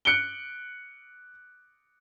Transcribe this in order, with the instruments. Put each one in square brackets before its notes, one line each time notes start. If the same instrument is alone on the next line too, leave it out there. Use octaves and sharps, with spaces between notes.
[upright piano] F#6 C#7 D7 G7